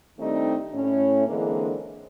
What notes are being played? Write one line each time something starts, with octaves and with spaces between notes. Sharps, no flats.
D#3 G3 A3 C4 D4 D#4
A2 C#4
D3 E3 G#3 A#3 C4 D4